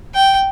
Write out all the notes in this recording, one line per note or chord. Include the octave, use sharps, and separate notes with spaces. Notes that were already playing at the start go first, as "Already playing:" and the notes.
G5